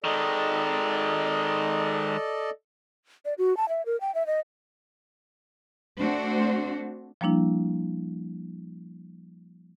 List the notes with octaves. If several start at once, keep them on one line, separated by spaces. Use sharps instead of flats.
D#3 G#3 A4 D5 D#5
D5
F#4
A5
E5
A#4
G5
E5
D#5
A3 C4 D4 F#4 C5
F3 G3 A#3 D4 E4